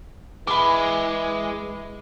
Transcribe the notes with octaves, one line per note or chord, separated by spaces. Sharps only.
E3 G#3 B5 D6